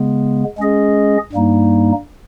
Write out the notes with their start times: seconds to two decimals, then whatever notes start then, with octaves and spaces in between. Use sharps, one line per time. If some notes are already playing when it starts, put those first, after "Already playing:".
Already playing: C#3 G#3 B3
0.58 G#3 C#4 G#4 D#5
1.33 G2 G3 A#3 D#4